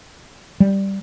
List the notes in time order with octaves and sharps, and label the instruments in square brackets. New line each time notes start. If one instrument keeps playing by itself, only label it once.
[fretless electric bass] G3